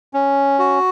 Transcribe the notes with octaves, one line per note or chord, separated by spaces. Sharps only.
C#4
F#4